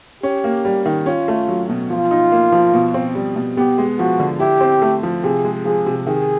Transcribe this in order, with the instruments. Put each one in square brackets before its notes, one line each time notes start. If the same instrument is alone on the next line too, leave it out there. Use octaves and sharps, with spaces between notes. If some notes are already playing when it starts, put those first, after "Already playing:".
[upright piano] C#4 [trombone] G4
[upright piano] A#3
G3
D#3
[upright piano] C#4 [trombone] F4
[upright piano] A3
F#3
B2
[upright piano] F3 [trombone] F4
[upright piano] D#4
A#3
F3
B2
C4
G3
B2
[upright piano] B3 [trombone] G4
[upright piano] G#3
[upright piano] F3 [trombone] F#4
[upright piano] D3
[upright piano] E4 [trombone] G4
[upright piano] C4
A3
F3
[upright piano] C3 [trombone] G#4
[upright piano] G#3
[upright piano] F3 [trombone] G#4
[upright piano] C3
[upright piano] D#3 [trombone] G#4